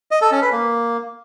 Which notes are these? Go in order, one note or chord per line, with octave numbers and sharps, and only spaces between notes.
D#5
A4
C#4
B4
A#3